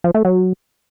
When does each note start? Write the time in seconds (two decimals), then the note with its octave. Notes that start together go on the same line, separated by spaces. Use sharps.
0.04 F3
0.14 A3
0.25 F#3